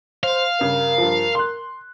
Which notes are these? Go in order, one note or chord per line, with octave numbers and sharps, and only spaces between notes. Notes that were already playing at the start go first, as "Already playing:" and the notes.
C5 F5
G2 C#3 A#4
G2 F3
C6 F#6